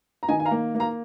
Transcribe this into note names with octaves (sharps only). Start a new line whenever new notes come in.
A#5
D#3 D#5 G#5
G#5
F5 A#5
A#3
A#3
F5 A#5